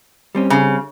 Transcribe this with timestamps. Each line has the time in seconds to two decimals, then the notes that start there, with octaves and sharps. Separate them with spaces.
0.35 G3 C4 C#4
0.50 C#3